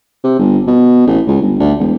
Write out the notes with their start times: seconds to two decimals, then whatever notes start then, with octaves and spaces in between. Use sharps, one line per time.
0.24 C3
0.39 G1
0.67 B2
1.07 A1
1.27 C#2
1.42 G1
1.60 D2
1.79 E1